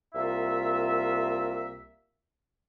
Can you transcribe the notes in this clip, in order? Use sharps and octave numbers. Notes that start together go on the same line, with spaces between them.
C2 A#3 F4 E5